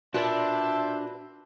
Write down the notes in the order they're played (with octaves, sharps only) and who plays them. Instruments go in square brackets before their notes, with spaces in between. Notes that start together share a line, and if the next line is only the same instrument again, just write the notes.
[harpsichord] A#2 [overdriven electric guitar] D4 [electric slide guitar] F#4 B4 [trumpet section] C5 E5 A5